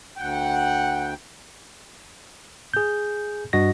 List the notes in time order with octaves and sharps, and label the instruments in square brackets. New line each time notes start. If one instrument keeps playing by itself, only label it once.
[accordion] D2 G5 [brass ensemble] F#5
[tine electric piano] G#4 G6
G2 F#4 D#5 A#6